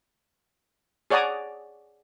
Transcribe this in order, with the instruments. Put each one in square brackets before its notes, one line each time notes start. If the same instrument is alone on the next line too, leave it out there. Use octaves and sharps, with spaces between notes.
[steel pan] G#4 C#5 D5 F#5 A#5 D#6